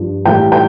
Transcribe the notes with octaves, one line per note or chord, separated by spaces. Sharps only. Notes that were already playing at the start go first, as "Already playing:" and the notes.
Already playing: G2 F3
A2 E3 G3 G5
G5